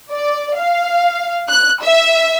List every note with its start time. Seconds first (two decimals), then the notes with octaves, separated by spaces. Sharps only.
0.12 D5
0.58 F5
1.49 F#6
1.82 E5